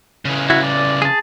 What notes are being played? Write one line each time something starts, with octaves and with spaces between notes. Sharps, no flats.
C#3 E3
E4 F#4
D5
G#4 A5